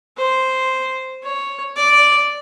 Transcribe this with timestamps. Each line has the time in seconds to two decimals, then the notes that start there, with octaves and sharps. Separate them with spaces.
0.17 C5
1.23 C#5
1.76 D5